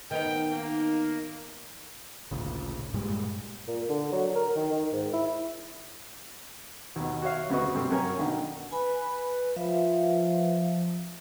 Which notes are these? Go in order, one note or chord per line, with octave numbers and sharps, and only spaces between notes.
D#3 B3 D#4 G5
A#3
A1 D2 A#2 C#3
G2 A#2 G3 G#3
A#2
D3
F#3
A#4
D#3
D#3
G#2
E4
D#2 B2
F#4 C#5 E5 F5
D2 C#3 B3 F#4 D#5 C#6
G2 C3 A3 C4
F#2 C#4 A#4 C#5 G#5 A#5
B2 D3 D#3
B4 G#5 B5
F3 B4 E5 F5